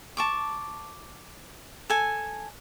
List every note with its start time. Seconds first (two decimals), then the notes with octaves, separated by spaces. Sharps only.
0.17 A5 C#6 D6
1.90 A4 G#5